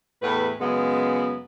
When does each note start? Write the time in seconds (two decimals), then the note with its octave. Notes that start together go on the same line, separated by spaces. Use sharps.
0.22 E2 A2 B4
0.59 F#2 C#3 G#3 B3